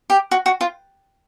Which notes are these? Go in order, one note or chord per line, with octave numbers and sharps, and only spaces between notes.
G4
F#4
F#4
F4